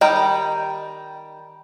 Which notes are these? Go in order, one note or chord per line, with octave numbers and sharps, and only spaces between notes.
D#3 G3 D#5 G5